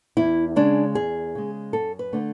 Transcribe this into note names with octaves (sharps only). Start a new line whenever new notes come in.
E2 E4
C#3 G#3 D4
E2 G#4
C#3 G#3
F#2 A4
B4
D3 A3 D4